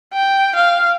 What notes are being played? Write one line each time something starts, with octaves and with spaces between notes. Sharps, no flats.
G5
F5